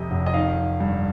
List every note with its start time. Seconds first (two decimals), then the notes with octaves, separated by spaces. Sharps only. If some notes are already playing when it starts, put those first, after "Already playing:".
Already playing: F2 C3 D#5
0.11 F1
0.26 D#5
0.34 D#3 F5
0.58 D#3
0.80 G2